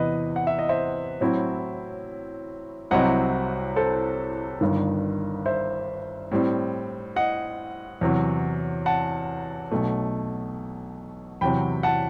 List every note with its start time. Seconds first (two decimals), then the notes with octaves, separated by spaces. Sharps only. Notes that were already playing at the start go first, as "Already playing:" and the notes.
Already playing: E2 C3 E3 B3 B4 D#5
0.36 F#5
0.47 E5
0.59 D#5
0.69 C5 E5
1.21 A2 F#3 C4 E4
2.91 C2 C3 F#3 C4 E4 D#5 F#5
3.76 A4 C5
4.61 G1 G2 D#3
5.46 C5 E5
6.31 A2 G3 C4
7.16 D#5 F#5
8.01 E2 C3 F#3
8.86 F#5 A5
9.71 B1 B2 A3
11.41 E2 C3 F#3 G5 B5
11.83 F#5 A5